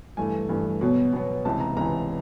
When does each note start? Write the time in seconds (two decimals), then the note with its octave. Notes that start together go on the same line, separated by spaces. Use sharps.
0.17 G2 E3 A3 G#5
0.49 G2 E3 A3
0.81 B2 F#3 B3
1.13 B2 F#3 B3
1.45 C#2 C3 E3 A5
1.60 A#5
1.77 C#2 C3 E3 A#5